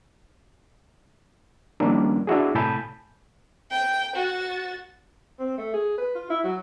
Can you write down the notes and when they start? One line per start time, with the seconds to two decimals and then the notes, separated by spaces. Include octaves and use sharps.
1.80 D#3 F3 G3 A#3 C#4 D4
2.27 D4 E4 F#4 G#4
2.55 A2 C3 G#5 A5 B5 G6
3.71 G5
4.16 F#4 A6
5.39 C4
5.57 A3
5.73 G#4
5.98 B4
6.15 F4
6.30 E4
6.44 F#3